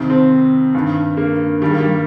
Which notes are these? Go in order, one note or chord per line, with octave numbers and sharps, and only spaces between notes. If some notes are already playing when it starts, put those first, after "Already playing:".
Already playing: F2 C3 D#3
C4
G2 D#3
A#3
G2 D#3 G3
A#3
G3